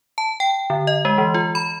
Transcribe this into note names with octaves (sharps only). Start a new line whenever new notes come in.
A5
G5
D3
D#5
G#3
E3
F4
B5